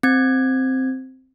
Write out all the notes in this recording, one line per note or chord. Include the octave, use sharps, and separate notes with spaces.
C4 G#6